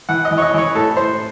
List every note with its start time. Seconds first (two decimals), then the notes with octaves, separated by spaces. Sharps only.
0.09 E3 F#5
0.25 D#5
0.31 E3
0.38 C#5
0.42 D#5
0.54 E3 C#5
0.75 A2 A4
0.97 A2 C5